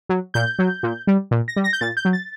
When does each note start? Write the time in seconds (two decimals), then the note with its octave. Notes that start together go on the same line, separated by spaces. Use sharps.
0.09 F#3
0.34 A#2 G6
0.59 F#3
0.83 A#2
1.07 G3
1.31 A#2
1.48 A#6
1.56 G3
1.64 A#6
1.73 G6
1.81 A#2 A6
1.97 G6
2.05 F#3
2.13 A6